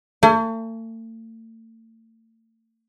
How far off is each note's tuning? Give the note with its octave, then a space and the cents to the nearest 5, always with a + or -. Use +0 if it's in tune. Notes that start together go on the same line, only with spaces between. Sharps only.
A3 +40 G#5 +25